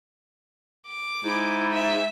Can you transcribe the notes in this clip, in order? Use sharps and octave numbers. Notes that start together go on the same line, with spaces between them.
D6
G#2 E4
E5